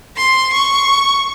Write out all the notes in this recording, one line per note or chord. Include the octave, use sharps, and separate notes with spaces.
C6
C#6